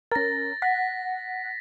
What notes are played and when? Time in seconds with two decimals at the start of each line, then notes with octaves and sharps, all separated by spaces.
0.11 C#4 A#4 A6 A#6
0.62 F#5 A#6 B6